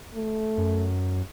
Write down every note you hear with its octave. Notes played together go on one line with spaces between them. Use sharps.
A3
F#2